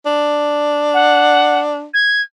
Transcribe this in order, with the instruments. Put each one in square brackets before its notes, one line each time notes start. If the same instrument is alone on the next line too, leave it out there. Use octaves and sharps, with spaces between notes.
[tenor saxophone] D4
[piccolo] F#5
G#6